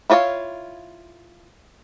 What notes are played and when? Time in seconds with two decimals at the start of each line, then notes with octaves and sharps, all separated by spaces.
0.10 E4 F4 C#5 D5 F5